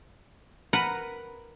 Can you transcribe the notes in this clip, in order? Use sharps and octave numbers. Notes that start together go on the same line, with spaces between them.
A#4 B4 F#5